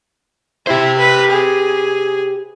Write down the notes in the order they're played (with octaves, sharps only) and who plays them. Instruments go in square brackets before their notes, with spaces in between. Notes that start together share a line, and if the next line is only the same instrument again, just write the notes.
[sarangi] E4 [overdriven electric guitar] G4 C5
[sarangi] B4
G#4